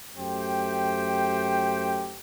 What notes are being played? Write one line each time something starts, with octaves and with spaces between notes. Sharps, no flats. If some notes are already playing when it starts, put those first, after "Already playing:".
F#2 A3 G4 C5 G5